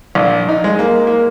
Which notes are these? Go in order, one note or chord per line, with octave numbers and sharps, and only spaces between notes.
A#1
D#4
G#3
A#3
A#3